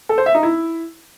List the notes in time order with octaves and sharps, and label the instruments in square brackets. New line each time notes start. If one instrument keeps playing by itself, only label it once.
[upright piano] A4
C5
E5
D#4
E4